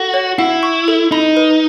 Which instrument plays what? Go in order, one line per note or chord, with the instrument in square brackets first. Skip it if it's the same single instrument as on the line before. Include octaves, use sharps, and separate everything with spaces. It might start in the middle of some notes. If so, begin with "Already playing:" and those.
Already playing: [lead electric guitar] F#4 [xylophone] A4
[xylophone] C#5
[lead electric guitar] E4 [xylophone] F#5
[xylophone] C#6
A4
[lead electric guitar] D#4 [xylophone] B5
[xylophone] B4